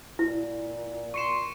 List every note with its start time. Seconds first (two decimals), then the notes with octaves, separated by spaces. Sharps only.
0.19 A#2 E4
1.14 C6 C#6 C#7 E7